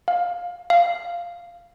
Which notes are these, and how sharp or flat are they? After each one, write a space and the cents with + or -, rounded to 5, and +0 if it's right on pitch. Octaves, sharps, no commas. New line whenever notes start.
F5 +15
F5 -10